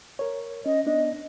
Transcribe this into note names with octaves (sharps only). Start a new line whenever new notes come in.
A#4 C#5
C#4 D#5
B3 D4 D#5